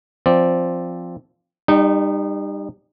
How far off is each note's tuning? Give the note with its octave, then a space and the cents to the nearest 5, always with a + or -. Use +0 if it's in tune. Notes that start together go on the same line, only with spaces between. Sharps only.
F3 +0 C4 +0 D5 +0
G3 +20 D#4 -30 G5 -30